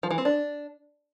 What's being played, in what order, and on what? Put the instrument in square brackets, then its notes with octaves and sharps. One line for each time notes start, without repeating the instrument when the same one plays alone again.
[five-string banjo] F3
E3
C4
D4